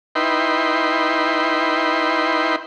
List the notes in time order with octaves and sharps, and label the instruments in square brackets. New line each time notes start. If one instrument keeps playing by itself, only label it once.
[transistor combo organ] D#4 E4 B4 G5 C6